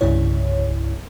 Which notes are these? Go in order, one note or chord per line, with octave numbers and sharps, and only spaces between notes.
C2 G2 C#3 E4 C#5